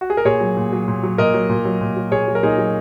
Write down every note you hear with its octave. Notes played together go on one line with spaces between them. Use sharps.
F#4
G#4
A#4
A#2 G#4 C#5
F#3
A#2
F#3
A#2
F#3
A#2 A#4 D#5
F#3
A#2
F#3
A#2
F#3
A#2 G#4 C#5
F#3
A#4
A#2 D#4 G#4
F#3